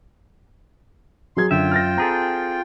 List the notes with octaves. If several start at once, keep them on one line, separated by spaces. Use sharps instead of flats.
F#3 G#4 C6 G#6
F#2 D3 F4 E5 G5
F6 A6 A#6
C4 G#4 A4 A#5